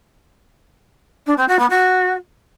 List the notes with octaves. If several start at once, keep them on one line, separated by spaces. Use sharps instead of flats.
D4
C4
F#4
B3
F#4